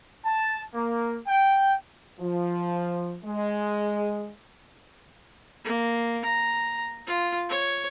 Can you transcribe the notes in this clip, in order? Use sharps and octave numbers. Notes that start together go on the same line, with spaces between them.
A5
A#3
G5
F3
G#3
A#3
A#5
F4
C#5